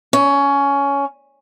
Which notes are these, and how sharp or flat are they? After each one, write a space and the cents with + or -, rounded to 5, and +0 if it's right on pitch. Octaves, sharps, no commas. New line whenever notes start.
C#4 +15